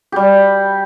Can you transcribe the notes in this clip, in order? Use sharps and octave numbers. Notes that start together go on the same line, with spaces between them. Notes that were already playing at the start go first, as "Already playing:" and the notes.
G3 G4